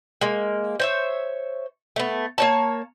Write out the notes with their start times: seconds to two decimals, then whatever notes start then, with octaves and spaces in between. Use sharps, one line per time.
0.21 G#3 A#3
0.80 C5 C#5 E5
1.96 A3 B3
2.38 A#3 C#5 A5